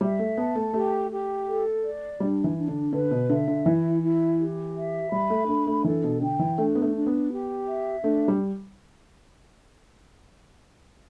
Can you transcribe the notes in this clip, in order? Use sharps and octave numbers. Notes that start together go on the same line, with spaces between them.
G3 E5
A3
B3 A5
A3
A3 G4
G4
A4
D5
G3 D4
E3
D4
D3
D3 B4
B2
D3 E5
D3
E3 E4
E4
G4
E5
G3 B5
A3
A3 D4
A3
E3 A4
B2
D3 G5
E3
A3 D4
B3
A3
D4
B3
G4
E5
A3 D4
G3